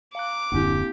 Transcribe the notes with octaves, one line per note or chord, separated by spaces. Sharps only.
F5 A#5 D6 F#6
D#1 F#2 D3 A#3 C4 E4 G4